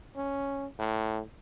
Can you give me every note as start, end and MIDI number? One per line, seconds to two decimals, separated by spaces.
0.16 0.66 61
0.79 1.21 45